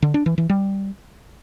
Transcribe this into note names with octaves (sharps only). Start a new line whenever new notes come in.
D3
D4
E3
E3
G3